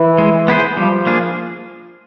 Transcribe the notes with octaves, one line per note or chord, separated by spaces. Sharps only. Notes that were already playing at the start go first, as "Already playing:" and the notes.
Already playing: E3
G#3
B3 E4 G#4 C5
F3 G3
A#3 D4 F4 G#4